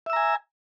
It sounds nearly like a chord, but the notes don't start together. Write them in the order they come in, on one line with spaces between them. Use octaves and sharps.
E5 E6 A#5 G#5